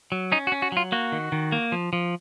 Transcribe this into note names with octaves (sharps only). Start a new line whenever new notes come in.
F#3
C#4 D#4
F#4
C#4
F#4
F#3 F4
A#3 F#4
D#3
D#3
A#3
F3
F3